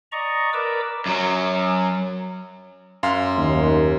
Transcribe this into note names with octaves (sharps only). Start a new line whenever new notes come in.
D5 D#5 A#5 C#6
A#4 B4 D5 D6 E6
F#2 F#3
F#2 F5 C6
D#2 A#3